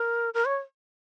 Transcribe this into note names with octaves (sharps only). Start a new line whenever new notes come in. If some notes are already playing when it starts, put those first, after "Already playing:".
Already playing: A#4
A#4
C#5